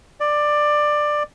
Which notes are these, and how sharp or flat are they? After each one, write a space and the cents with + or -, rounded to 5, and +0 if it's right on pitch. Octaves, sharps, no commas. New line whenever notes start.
D5 +15